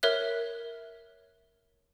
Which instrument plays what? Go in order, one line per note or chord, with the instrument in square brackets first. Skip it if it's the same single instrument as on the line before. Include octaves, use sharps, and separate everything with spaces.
[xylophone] A#4 C#5 E5 F#6